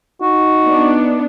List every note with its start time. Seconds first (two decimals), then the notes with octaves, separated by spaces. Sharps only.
0.22 D#4 F#4
0.66 B3 D4